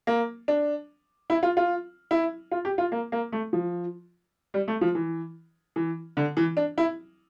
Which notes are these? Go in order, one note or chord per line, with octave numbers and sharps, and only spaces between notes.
A#3
D4
E4
F4
F4
E4
F4
G4
F4
A#3
A#3
A3
F3
G3
A3
F3
E3
E3
D3
E3
D4
E4